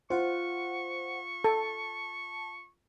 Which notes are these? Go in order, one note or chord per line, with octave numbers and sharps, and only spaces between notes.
F4 C5 F#5 C#6
A4 A5